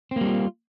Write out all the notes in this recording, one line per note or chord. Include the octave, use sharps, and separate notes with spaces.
G3 A#3 C4 F4